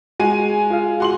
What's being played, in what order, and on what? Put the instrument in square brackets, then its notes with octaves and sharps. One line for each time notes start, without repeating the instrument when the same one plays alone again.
[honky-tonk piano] G#3 G#5 D#7 [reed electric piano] F#4
[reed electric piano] F4 G#4 F5
[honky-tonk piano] F#4 C6 F#7